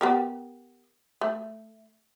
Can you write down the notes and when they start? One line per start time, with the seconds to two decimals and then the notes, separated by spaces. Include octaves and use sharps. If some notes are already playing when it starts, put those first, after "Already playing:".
0.01 B3 G4 A#4
1.21 A3